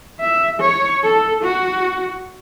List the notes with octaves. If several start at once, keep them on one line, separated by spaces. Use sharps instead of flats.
E5
C#5
A4
F#4